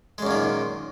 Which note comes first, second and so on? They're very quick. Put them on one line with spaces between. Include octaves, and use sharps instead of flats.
G#3 F#2 A#2 D#3